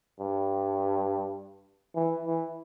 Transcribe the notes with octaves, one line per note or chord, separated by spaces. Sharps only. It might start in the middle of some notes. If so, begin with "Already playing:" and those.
G2
E3
E3